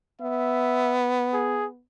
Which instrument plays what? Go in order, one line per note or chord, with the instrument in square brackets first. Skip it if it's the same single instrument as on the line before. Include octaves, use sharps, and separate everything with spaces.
[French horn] B3 [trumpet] E5
[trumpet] G#4